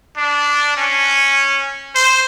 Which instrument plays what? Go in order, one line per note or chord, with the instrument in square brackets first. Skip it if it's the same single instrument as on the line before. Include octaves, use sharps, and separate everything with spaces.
[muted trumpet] D4
C#4
C5